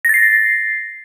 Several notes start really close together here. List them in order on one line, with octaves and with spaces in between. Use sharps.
A#6 A6 C7